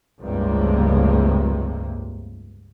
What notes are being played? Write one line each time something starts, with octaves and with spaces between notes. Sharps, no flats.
F1 C#2 G2 C3 F3 A#3